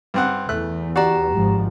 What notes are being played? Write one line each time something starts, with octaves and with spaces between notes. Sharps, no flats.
G2 C4 F#5
E2 A3 F#6
F#4 G4 D5 A#5
G#1 G#2 F3